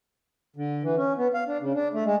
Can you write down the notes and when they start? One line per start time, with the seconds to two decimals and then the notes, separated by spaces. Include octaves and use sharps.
0.56 D3
0.83 E3
0.97 C#4
1.17 B3
1.34 F5
1.47 D4
1.61 C#3
1.74 D4
1.93 A3
2.05 G#3